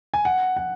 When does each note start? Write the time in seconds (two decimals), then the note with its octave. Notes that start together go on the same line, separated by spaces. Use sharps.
0.14 G#5
0.25 F#5
0.57 F#5